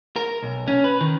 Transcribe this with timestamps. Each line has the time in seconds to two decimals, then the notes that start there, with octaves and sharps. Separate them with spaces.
0.16 A#4
0.42 B1
0.68 C#4
0.84 B4
1.01 D#3